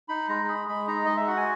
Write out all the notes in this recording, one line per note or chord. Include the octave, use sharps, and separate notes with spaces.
D#4 B5
G#3 A#5
G#4 B5
G#3 B5
D#4 A#5
G#3 D#5
E5
F#4 F#5
G#5